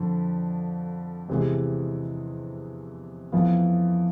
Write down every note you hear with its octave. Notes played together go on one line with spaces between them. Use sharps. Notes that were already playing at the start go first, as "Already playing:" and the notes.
Already playing: F2 D3 F3
E2 C3 E3 G#3
F2 E3 B3 F4